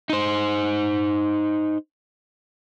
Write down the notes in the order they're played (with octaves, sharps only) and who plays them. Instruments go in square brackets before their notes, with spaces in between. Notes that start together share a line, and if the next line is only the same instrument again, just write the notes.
[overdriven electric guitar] D#4 C5